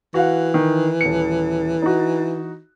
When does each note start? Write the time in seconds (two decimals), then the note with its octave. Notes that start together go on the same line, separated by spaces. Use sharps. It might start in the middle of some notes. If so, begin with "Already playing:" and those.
0.14 E3 F#4 F5 F#5
0.54 D#3
1.01 D#1 C#7
1.82 D#4 F#4